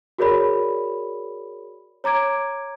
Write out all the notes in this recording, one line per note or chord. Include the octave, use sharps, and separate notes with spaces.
F#4 G#4 A#4 C#5 D5 B5
C#5 A#5 D6 G#6 D7